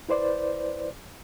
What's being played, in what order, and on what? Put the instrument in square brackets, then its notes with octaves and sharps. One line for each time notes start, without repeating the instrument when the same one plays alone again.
[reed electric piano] E4 B4 C5 D5